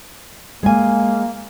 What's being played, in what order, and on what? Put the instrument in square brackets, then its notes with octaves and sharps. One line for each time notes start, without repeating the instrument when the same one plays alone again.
[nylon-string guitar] G#3 G#5 [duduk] A#3